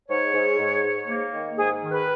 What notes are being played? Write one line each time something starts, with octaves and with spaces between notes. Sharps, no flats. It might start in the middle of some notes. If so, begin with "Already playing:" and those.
G#2 C#5
G#2
G#2
G#2
A#3
D#3
G#2 G#4
D#3
B4